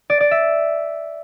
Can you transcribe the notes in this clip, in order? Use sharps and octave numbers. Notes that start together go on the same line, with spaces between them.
D5
D5
E5